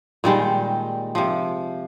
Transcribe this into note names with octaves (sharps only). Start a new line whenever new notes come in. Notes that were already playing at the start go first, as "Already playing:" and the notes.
A#2 D#3 G3 G#3
C3 F3